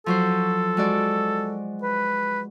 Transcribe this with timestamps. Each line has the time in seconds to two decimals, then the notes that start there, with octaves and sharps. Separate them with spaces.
0.06 F3 F#3 A4 C5
0.77 G#3 F#4 D5
1.82 B4